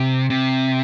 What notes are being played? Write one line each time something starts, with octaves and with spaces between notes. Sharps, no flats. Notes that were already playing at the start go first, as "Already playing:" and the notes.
Already playing: C3
C3